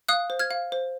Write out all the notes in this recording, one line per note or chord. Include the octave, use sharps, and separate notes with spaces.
F5 D#6 F#6
C5
F6 G#6
F5
C5